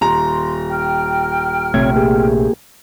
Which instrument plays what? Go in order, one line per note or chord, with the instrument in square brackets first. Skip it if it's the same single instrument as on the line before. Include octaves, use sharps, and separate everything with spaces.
[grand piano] D#1 A#5 [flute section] C6
[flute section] G5 F6
[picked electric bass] A#1 C3 A3 [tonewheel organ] C4 C#5 G#6
[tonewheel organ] A#3 G4 G#4